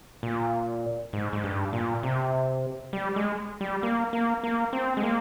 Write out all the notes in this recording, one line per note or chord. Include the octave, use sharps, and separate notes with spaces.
A#2
G#2
G#2
G2
A#2
C3
G3
G#3
G3
A#3
A#3
A#3
C4
G#3
A#3